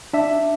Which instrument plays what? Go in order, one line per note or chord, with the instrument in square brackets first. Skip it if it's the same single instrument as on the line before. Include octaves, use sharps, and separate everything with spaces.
[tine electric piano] D4 E5